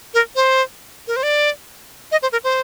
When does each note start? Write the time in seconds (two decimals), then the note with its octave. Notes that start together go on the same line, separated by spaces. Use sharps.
0.14 A#4
0.36 C5
1.08 A#4
1.16 C5
1.23 D5
2.12 D#5
2.22 C5
2.32 A#4
2.44 C5